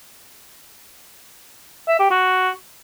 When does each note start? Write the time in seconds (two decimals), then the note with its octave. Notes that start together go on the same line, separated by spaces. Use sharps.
1.88 E5
1.99 G4
2.11 F#4